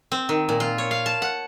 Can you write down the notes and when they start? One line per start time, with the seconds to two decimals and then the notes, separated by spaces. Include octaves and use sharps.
0.12 C4
0.29 D#3
0.49 A#2
0.60 F4
0.78 C#5
0.91 F5
1.06 A5
1.22 F#5